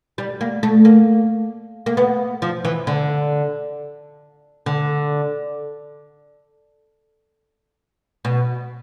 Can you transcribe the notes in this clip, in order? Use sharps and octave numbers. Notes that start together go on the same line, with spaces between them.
G3
A#3
A3
A#3
A#3
B3
F3
E3
D3
D3
B2